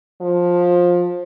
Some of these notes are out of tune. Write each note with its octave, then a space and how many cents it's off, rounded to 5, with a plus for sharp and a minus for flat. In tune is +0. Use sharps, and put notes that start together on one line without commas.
F3 +15